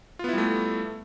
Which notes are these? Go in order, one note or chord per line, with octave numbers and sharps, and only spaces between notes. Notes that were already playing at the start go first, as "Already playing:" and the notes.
G3 A3 B3 E4 F4